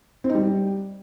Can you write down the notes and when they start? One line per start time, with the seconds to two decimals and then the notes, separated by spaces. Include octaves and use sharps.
0.24 C4
0.29 D#4
0.35 G3